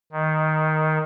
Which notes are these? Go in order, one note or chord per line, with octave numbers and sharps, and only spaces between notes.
D#3